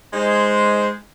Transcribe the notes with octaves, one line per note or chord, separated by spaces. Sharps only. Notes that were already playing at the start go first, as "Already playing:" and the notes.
G#3 D#4 C5